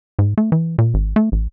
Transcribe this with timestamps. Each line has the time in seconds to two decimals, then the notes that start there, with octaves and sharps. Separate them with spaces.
0.19 G#2
0.38 A3
0.52 E3
0.78 A#2
0.94 G#1
1.16 A3
1.32 A1